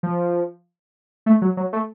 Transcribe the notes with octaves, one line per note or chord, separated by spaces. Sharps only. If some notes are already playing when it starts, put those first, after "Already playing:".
F3
A3
F#3
F#3
A3